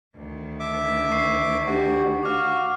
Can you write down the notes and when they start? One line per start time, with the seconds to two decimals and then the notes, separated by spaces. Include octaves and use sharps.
0.15 D2 D#3
0.60 E5 D6
1.12 C#6 C7
1.66 D4 D#4 F#4 G4
2.23 F#4 F5 D6 F6